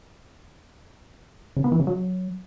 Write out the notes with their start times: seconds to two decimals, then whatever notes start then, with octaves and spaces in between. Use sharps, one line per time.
1.57 C#3
1.64 B3
1.72 E3
1.79 C#3
1.87 F#3